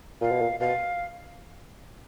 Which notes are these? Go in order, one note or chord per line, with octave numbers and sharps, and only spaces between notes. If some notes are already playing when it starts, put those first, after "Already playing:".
A#2 F5
B2
A#2
B2 F5